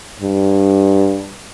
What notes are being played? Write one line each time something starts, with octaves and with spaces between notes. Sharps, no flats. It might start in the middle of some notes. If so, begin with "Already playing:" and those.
G2